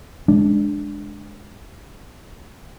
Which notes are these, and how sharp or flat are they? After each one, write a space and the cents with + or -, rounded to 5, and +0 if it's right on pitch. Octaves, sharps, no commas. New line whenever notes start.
G#3 +5 D4 +0